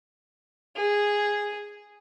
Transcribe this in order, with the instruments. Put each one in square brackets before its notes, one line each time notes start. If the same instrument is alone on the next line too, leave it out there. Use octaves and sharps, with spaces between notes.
[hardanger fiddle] G#4